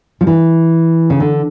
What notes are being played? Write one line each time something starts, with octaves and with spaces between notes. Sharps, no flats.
F3
E3
C#3
D3